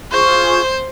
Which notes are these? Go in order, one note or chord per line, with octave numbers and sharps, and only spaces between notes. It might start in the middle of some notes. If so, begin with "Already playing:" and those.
F4 G#4 C5 C#6